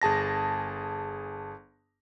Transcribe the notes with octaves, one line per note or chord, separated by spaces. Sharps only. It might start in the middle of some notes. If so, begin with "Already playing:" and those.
G1 G#4 A5 A#6